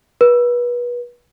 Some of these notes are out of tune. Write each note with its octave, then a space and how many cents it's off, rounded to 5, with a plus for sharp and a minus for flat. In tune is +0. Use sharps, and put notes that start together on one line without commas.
B4 -30